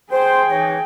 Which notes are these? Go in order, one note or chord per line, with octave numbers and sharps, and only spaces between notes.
G#4 C5 G5
E3 D#4 C#5